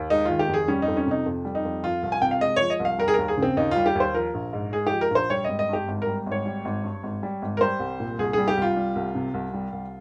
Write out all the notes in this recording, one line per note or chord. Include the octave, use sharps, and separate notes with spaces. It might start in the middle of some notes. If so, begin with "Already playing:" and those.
Already playing: D#2
G#3 D#4
D#3 F4
G4
F1 G#4
G3 C#4
D#4
F2
C#4
C3 D#4
F2
G3
D#4
F2
F3 F4
C2
G#5
C3 G5
F5
G#3 D#5
F3 C#5
D#5
C2
F5
G3 A#4
G#4
D#2 A#4
G#4
C#3 C4
D#2 D#4
G3 F4
G4
D#2 C5
F3 A#4
A#1
G#2
G#3 G#4
F3 G4
A#4
A#1 C5
G3 C#5
G#1 D#5
D#5
G2 G4
G#1
A#4
G3
G#1
C#5
G3
G#1
G2
G#1
G3
G#1
A#4
G3 C5
C2
A#2
C2 G#4
G3 G#4
G4
C2 F4
G3
C2
C3
C2
G3
C2